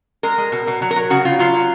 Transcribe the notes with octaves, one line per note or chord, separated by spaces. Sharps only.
G#3 A#4
G#3
B2
B2
F#3
A#4
F#3
C#3 F#4
C#3 F4
F#3 F4
F#3